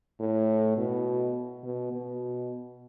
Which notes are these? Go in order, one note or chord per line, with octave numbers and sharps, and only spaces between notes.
A2
B2
B2
B2